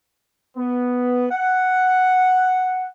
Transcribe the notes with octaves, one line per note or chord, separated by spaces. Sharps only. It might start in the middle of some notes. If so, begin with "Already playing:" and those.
B3
F#5